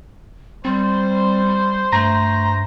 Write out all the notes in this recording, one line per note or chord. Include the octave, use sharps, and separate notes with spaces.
G3 C4 C5
G2 A3 A#5